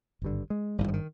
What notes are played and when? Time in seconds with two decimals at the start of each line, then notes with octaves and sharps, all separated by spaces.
0.22 G#1 G2 D3
0.50 G#3
0.78 G#1 G2 D3 G3
0.88 F3
0.93 D#3